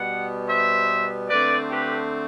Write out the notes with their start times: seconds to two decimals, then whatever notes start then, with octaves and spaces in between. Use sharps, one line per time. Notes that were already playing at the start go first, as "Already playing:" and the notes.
Already playing: B2 G3 B3 F#5
0.49 C5 E5
1.29 D3 A3 C4 B4 D5
1.70 G4 B4